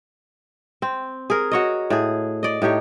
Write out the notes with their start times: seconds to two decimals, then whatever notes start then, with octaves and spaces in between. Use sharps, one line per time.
0.82 C4
1.30 G#4 A#4
1.52 F#4 C#5 D#5
1.90 A2 G#4
2.43 D5 D#5
2.62 A2 D#4 G4 C#5